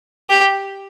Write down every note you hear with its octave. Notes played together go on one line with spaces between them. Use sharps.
G4